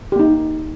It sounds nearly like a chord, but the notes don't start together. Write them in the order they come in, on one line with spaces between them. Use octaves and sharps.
G4 A#3 D#4